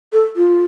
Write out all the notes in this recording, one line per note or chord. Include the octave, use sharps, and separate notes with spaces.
A4
F4